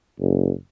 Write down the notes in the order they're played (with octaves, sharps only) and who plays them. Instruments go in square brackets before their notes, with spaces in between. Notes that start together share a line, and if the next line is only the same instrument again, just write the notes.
[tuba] F#1